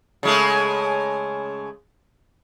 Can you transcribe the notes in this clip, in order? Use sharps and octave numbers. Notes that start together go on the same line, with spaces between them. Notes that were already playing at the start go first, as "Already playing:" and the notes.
C#3 G#3 A3